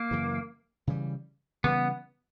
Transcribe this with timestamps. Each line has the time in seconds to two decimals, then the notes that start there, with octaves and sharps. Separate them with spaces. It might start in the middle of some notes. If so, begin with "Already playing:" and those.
Already playing: A#3
0.11 F#2 C#3 E3
0.87 C#3 E3 G3
1.64 C#3 E3 G3 B3